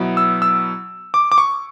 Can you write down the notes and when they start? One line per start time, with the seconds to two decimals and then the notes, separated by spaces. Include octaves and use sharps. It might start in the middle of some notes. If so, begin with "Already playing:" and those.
Already playing: B2 F#3 B3 E4
0.17 E6
0.42 E6
1.14 D6
1.32 D6
1.38 C#6